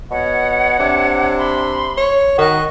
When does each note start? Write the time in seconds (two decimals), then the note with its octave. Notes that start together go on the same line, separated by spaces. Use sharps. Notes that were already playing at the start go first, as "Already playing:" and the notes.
0.11 B2 C#5 F#5
0.80 C3 D4
1.38 B5 C6
1.98 C#5
2.38 D#3 F#4 D#5 C#6 F#6